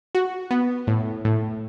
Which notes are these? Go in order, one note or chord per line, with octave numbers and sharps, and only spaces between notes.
F#4
B3
A2
A2